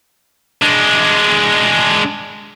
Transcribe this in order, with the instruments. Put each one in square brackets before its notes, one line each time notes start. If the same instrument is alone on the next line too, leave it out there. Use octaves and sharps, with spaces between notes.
[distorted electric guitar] G#3 D4